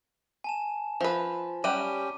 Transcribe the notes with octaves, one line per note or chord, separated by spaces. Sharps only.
G#5 A5 E7
F3 B4
G3 C#4 G4 F#5 G5 D#7